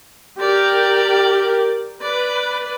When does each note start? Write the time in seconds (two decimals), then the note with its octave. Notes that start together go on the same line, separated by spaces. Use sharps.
0.40 G4 A#4 D5
2.02 B4 D5